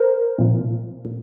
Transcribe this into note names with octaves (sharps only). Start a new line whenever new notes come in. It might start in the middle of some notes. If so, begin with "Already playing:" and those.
Already playing: A#4 C5
C2 A#2 F3
A#2